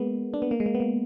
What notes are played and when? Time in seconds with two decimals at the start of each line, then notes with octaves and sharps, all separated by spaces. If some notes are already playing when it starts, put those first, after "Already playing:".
Already playing: G#3 A#3 B3
0.34 D4
0.42 B3
0.51 A#3
0.60 G#3
0.66 A#3
0.75 B3
0.80 A#3